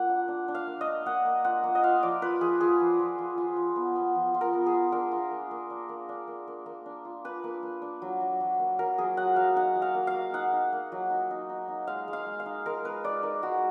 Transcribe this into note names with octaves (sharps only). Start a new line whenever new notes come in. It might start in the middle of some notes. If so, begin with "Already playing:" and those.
Already playing: A#3 F4 F#5
D4
D4
D4
F5
A#3
D#5
D4
A#3 F#5
A#3
F4 F#5
A#3
D#5
F4 F5
F3 D5
F4 B4
F3 G#4
F4 G#4
F3
F3
F3
F4
F3
B3
B3
F3
F4
A#4
B3
G#4
F4
D4 A#4
F4
A#3
A#3
D4
A#3
D4
A#3
A#3
A#3
D4
F4
D4 B4
A#3
A#3
D4
F#3
F#3
F#3
A#3
F#3 A#4
F#3 G#4
F#3 F#5
F#3 F5
D#4 F#5
F#3
F5
A#3
F5
A#3
D#4 F#5
D#4
A#3
F#3
D#4
D#4
D#4
D#4
G#3 F5
G#3
F5
G#3
F5
D#4
G#3 A#4
D#4 B4
D#4 D5
D#4 A#4
G#3 F#4